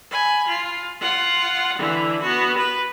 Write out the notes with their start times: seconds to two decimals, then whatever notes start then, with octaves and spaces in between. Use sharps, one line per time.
0.11 G#5 B5
0.48 F4
1.01 F4 F#5
1.78 D3 E3
2.22 B3 F#4
2.58 B4